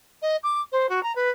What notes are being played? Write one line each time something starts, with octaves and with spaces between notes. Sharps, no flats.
D#5
D6
C5
F#4
A#5
B4